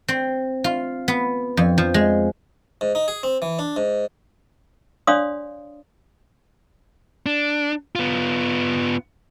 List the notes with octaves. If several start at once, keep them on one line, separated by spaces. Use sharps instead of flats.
C4
F4
B3
F2
F3
G#3
G#2
D#4
G#4
C4
E3
D4
G#2
D4 C#5 D5 F5 C6 D#6
D4
B3 F4